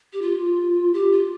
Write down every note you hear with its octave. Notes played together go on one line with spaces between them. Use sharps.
G4
F4
G4
F4